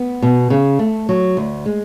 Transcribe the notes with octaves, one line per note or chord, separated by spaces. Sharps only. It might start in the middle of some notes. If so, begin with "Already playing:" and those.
Already playing: B3
B2
C#3
A3
F#3
D2
G#3